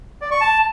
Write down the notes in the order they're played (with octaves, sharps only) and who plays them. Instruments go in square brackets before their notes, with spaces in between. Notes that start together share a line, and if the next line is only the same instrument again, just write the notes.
[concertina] D5
C#6
A5